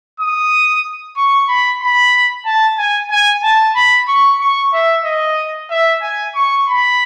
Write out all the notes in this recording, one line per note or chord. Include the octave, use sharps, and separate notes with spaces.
D#6
C#6
B5
B5
A5
G#5
G#5
A5
B5
C#6
C#6
E5
D#5
E5
G#5
C#6
B5